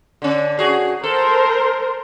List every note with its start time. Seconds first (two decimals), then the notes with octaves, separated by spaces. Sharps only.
0.22 D3 C#4
0.59 F#4 G#4
1.04 A4 A#4 C5